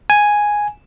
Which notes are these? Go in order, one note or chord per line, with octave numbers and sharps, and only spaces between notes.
G#5